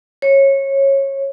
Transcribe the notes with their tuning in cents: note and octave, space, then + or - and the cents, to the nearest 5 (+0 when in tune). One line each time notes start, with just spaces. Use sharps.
C#5 -20